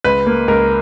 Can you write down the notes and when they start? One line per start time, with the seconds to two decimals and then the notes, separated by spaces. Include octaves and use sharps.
0.04 C#2 B4
0.27 A#3
0.48 C#2 A#4